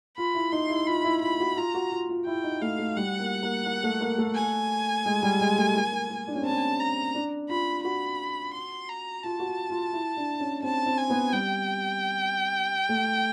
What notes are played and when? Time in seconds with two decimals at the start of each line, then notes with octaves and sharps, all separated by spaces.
0.18 F4 B5
0.35 E4
0.52 D#4 C6
0.70 E4
0.87 F4 B5
1.04 E4
1.22 F4 B5
1.40 F#4
1.56 F4 A#5
1.74 F#4
1.92 F4
2.09 F4
2.27 E4 G5
2.44 D#4
2.61 A3 F5
2.79 A3
2.96 G3 F#5
3.19 A#3
3.43 A#3
3.66 A#3
3.83 A3
4.01 A#3
4.18 A3
4.35 G#5
5.05 G#3
5.22 G3
5.40 G#3
5.58 A3
5.75 A#3
5.92 A#3
6.10 A#3
6.28 D4
6.35 C#4
6.42 C4
6.45 A5
6.50 C#4
6.80 A#5
7.15 D4
7.49 F4 B5
7.84 F#4 B5
8.54 C6
8.88 A#5
9.23 F4 A5
9.39 F#4
9.46 F4
9.70 F4
9.93 E4
10.17 D4
10.40 C#4
10.63 C4 A5
10.86 C4
10.98 G#5
11.10 B3
11.33 G3 G5
12.89 A3